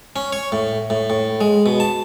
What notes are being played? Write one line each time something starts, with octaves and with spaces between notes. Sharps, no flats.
C#4
C#5
A2
A2
A2
G#3
B2
A5